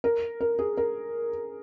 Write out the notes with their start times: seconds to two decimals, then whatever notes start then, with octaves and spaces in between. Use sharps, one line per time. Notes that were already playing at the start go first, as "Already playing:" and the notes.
0.04 A#4
0.41 A#4
0.59 G#4
0.77 A#4